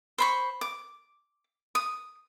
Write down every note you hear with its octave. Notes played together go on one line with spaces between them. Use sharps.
C5 B5 C#6
D6
D#6